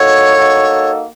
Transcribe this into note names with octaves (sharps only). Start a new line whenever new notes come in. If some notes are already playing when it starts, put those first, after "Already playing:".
Already playing: A#3 D#4 F#4 A4 C#5
A#3 D#4 F#4 A4